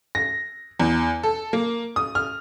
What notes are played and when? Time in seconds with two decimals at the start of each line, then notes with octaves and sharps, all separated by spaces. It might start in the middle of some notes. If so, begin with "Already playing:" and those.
0.15 A#6
0.80 E2
1.23 A4
1.53 A#3
1.96 D#6
2.15 F6